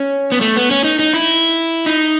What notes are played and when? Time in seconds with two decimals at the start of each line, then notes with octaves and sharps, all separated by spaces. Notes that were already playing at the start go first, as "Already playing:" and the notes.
Already playing: C#4
0.32 B3
0.41 A3
0.56 B3
0.71 C#4
0.84 D#4
0.99 D#4
1.13 E4
1.86 D#4